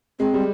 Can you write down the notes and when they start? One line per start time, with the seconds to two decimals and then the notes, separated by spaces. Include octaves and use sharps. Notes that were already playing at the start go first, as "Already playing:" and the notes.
0.19 G#3 C4
0.34 G3